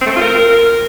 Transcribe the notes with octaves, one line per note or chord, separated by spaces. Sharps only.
C4
A3
C4
F4
A#4